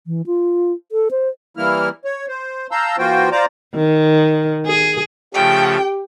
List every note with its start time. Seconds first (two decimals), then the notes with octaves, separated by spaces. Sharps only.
0.07 E3
0.27 F4
0.92 A4
1.11 C5
1.57 E3 G3 A#3 E4 F6
2.05 C#5
2.28 C5
2.71 F5 A5 A#5 E6 G6
2.98 E3 A#3 F4 F#4 C5 G5
3.32 F4 C5 D5 A#5 D6
3.75 D#3
4.66 G#4
5.34 C#3 F3 A3 G4 G5